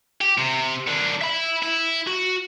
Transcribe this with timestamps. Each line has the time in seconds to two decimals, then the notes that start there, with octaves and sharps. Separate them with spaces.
0.21 G4
0.38 C3
0.87 D#3 D4
1.21 E5 B5
1.63 E4
2.07 F#4